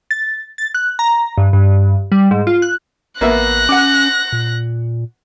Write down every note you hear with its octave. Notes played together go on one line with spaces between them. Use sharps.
A6
A6
F#6
A#5
G2
G2
G3
G#2
F4
F#6
A1 A#3 B3 E5 F#6 A#6
C#4 F#5 D6
A#2